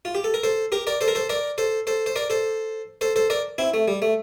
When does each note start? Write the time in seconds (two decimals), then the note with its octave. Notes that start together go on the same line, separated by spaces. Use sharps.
0.05 F4
0.15 G4
0.24 A4
0.34 A#4
0.43 A4 C5
0.72 G4 A#4
0.87 A#4 D5
1.01 A4 C5
1.08 A#4
1.15 A4 C5
1.29 A#4 D5
1.58 A4 C5
1.87 A4 C5
2.06 C5
2.16 A#4 D5
2.30 A4 C5
3.01 A4 C5
3.16 A4 C5
3.30 A#4 D5
3.58 C4 E4
3.74 A3
3.88 G3
4.02 A3